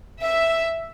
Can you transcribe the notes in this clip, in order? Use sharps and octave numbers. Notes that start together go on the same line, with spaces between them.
E5